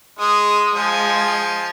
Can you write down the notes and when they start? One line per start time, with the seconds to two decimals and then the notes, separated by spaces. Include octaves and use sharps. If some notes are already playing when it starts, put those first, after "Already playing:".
0.19 G#3 D#6
0.75 F3 G#3 G#5